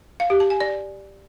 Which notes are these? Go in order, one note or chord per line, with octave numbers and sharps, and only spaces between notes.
F5
G4
A5
G#5
D5